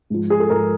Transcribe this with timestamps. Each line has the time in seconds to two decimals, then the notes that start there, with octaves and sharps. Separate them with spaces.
0.10 G#2 F3
0.30 G#4
0.40 A4
0.50 G#2 F3 A#4